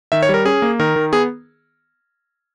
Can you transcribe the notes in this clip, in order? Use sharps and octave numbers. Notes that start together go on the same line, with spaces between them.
D#3 E5
C#5
G3 A#4
C#4 G#4
A#3
D#3 A#4
D#3
B3 G#4